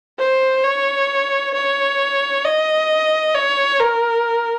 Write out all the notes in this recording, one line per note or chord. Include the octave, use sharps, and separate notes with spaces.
C5
C#5
C#5
D#5
C#5
A#4